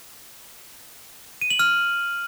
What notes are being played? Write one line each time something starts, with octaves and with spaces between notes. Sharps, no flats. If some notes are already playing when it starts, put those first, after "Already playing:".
D#7
F#7
F6